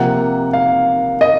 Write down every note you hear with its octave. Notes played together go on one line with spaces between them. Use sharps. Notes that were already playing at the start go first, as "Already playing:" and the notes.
Already playing: C3 F3 A#3 F#5
F5
D#5